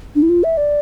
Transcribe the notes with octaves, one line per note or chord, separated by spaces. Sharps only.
D4
E4
F4
E5
D5